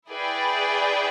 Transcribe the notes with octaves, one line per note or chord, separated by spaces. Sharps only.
E4 G#4 B4 D5 G5